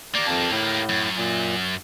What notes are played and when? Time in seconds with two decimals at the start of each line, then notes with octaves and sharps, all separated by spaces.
0.15 A#3 G4 D5
0.27 F2 A5
0.51 A2
0.89 F#2
1.16 A#2